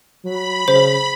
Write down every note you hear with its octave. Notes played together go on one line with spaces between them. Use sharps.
F#3 B5
C#3 C5